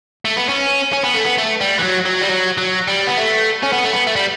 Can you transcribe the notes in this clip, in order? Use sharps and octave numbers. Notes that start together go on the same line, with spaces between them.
A3
B3
C#4
C#4
B3
A3
B3
A3
G3
E3
F#3
F#3
G3
F#3
F#3
G3
B3
A3
C#4
B3
A3
B3
A3
G3